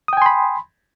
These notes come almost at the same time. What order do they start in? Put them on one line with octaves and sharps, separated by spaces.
D#6 G5 G#5 C6 B5